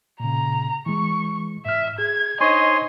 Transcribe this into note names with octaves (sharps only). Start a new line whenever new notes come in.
A#2 C#3 A#5
E3 G#3 C#6
G#2 E5 F6
G#4 G#6
D4 D#4 C5 C#5 D#5 G#5 C6